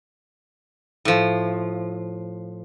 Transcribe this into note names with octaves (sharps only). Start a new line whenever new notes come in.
A2 F3